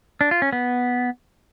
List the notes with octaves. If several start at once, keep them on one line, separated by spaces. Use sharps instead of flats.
D4
F4
C#4
B3